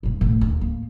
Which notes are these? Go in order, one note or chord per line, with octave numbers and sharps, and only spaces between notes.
G2 A#2
A1 A2
D#2
A2 A#3